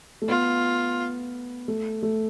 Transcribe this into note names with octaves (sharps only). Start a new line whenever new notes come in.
A3
B3 F4
A3
A3